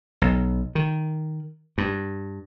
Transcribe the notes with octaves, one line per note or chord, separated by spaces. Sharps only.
B1
D#3
G2